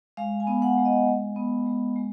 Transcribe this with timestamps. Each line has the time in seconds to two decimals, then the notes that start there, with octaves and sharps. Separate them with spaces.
0.17 G#3 F5
0.40 G#5
0.47 B3
0.62 F#5
0.77 G#3
0.85 D#5
1.06 G#3
1.36 B3
1.66 G#3
1.96 G#3